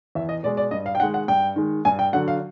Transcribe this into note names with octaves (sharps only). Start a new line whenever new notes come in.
E2 E5
D#5
B2 G#3 D5
D5
G2 D#5
F5
G5
D#3 G#3 F#5
F#5
G2 G5
D#3 G#3
G2 G#5
G5
D3 F#3 F#5
F5